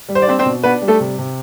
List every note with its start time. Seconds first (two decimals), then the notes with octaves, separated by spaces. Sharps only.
0.09 G3
0.15 C5
0.22 D5
0.27 C4 D4 C5
0.39 C4 C5
0.46 B2
0.64 B3 D4 B4
0.82 G3
0.88 A3 A4
1.00 C3
1.18 C3